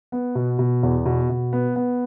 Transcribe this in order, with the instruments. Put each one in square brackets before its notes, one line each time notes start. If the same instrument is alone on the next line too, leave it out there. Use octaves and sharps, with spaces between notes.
[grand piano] B3
B2
B2
E2
B2
B2
B3
B3